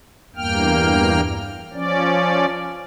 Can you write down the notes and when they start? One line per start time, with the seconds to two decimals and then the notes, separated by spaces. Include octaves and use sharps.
0.36 E2 G2 A#3 G5 F6
1.73 F3 C#4 D5